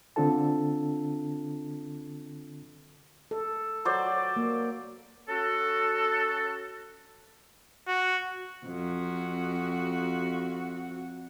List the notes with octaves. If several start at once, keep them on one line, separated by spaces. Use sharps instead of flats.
D3 C4 D4 F4 A4 A5
A4
F#3 C5 D5
A#3
C#4 F#4 A4
F#4
F2 F#4